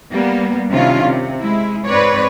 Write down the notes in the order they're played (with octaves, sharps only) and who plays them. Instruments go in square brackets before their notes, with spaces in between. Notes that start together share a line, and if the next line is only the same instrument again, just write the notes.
[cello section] G3 A#3 B3
C3 D#3 C#4 D4 E4 F4
C3
G#3 E4
G#2 C4 B4 C#5 D5